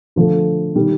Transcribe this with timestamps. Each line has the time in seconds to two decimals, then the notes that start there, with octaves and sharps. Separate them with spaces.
0.16 D3 F3 A3
0.76 D#3 G3